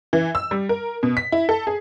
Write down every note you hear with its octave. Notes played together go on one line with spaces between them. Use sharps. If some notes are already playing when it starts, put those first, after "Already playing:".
E3
E6
G3
A#4
B2
B6
E4
A4
G#4